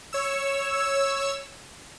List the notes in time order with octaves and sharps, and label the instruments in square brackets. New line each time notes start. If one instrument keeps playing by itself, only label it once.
[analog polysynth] C#5 E6